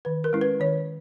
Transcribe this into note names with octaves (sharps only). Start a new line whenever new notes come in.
D#3 B4
A#4
G#3 C#4 E4
B4
D#3 C#5